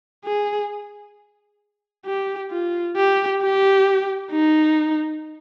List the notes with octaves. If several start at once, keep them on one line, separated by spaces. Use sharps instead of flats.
G#4
G4
F4
G4
G4
D#4